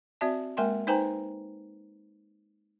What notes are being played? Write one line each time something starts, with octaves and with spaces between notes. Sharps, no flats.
C4 F#4 D5 E5 A5
G#3 A#3 A#4 G5 G#5 C6
D#4 B4 C5 G5 G#5 A#5